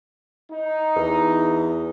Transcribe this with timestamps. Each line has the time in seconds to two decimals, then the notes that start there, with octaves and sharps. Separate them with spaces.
0.51 D#4
0.96 E2